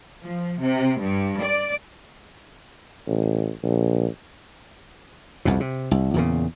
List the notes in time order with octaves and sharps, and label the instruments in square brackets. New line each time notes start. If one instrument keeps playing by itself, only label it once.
[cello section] F3
C3
G2
D5
[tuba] A1
A#1
[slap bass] C2 F2 B2
C3
C2
E2 A#2 C#3